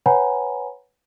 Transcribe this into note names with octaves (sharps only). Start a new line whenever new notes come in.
B4 C#5 F#5 G#5 A#5 B5